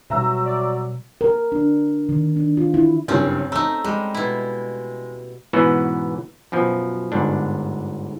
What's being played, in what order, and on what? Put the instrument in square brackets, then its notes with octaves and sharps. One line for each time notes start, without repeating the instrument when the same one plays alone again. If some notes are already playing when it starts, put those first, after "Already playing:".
[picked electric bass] B2 G3 [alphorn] F#3 [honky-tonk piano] E5 A#5 E6
[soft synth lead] D5
[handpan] A#4
D4
D#3
D4
F4
E4
[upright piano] F#1 G2 [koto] C#3 C4 C#4
[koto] A3 D#4 [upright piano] A#5 E6
[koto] G3 [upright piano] G#3
[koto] B2 E4
[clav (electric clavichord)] G#2 B2 E3 B3 C#4 F#4
F#2 B2 F3
G1 G#2 D4